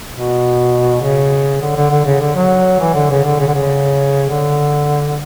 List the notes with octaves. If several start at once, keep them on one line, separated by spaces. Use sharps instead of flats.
B2
C#3
D3
D3
D3
C#3
D3
F#3
E3
D3
C#3
D3
C#3
D3
C#3
D3